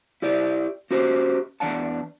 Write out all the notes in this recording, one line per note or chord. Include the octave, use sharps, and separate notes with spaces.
E4 G4 D5
C#4 F#4 G4 C5
E2 D4 F#5 A5